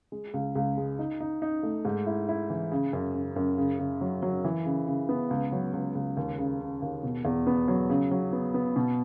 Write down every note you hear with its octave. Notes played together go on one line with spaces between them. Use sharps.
G#3
C#2
C#2
G#3
D#4
D#4
D#4
A3
G#2
E4
E4
E3
C#3
F#2
C#3
F#2
C#3
C#3
F#3
F#3
E3
C#3
C#3
B3
C#2
F#3
C#2
C#2
D#2
C#3
C#3
D#2
B2
E2
B3
F#3
C#3
F#3
B3
B3
B2